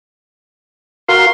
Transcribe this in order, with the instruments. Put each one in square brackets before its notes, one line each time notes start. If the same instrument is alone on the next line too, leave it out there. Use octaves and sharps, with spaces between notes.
[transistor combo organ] F#4 A#4 F5 [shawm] C6